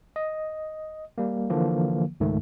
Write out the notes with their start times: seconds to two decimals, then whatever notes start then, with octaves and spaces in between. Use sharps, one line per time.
0.16 D#5
1.18 G3 A#3
1.50 D3 E3 F3 A#3
2.20 C#2 G#2 D#3 A3